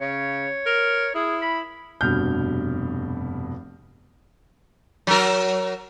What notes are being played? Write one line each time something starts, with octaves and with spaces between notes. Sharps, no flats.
C#3 C#5
A#4
E4 G#4
B5
F1 G2 B2 F6 G6
F#3 A#4